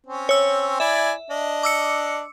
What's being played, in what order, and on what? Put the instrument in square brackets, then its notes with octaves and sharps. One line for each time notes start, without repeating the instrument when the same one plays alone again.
[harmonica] C4 C#4
[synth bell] C#5 E6
[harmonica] E4 D5 G#5 [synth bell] E5
[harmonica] D4 D#5
[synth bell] D6 E6 C#7